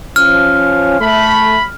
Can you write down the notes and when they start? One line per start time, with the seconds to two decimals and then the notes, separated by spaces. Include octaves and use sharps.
0.16 F3 C#4 F6
1.01 A3 B5